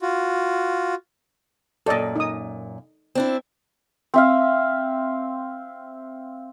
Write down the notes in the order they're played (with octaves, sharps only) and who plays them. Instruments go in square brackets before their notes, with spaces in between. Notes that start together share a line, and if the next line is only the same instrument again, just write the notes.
[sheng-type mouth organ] F4 F#4
[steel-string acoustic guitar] F#2 A#2 [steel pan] A4 D5 D#5
[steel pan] D#4 D#6
[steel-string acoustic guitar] C4 D4 E4
[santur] C4 E5 F5